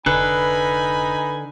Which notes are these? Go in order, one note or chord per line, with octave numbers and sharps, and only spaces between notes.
F1 D3 D#4 B4 G#5 B5